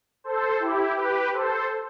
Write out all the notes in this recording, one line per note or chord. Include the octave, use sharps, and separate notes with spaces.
A4 C5
E4 G4
G4 B4
A4 C5